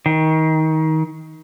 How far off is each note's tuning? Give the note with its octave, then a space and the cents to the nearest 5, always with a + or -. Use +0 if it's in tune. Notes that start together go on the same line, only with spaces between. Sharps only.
D#3 +25